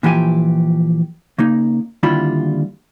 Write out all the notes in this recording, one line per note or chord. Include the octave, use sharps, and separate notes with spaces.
A#2 E3 F3 G4 G#5
C#3 A#3 D#4
D#2 D3 G3 E4 F4 B5